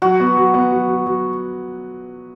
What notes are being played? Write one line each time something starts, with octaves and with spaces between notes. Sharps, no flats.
F#3 F#4
B3
F#3
B3
F#3
F#3
F#3